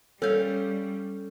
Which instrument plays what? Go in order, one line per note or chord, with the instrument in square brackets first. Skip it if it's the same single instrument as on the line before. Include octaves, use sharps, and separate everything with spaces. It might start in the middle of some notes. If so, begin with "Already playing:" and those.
[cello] G3 [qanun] C#4 F5 [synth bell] A4 G6